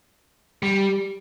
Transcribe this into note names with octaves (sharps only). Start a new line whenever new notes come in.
G3